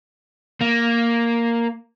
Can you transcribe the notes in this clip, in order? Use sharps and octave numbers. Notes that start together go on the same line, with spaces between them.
A#3